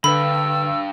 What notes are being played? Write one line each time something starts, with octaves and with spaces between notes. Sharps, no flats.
G2 D3 G3 B4 B5 E6